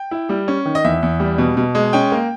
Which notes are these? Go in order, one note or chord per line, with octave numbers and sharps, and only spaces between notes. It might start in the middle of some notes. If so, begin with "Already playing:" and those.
Already playing: G5
E4
G3
C#4
D#3
D#5
E2 E5
E2
G3
B2
B2
G#3
C#4 G5
A#3